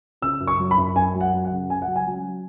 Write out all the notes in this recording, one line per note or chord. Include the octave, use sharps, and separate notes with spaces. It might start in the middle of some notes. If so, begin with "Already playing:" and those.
C#3 E6
F#2
C#6
F#3
B5
F#2
F#2 G#5
F#3
F#5
F#2
F#5
C#3
C#3 G#5
F#5
F#3
G#5
F#3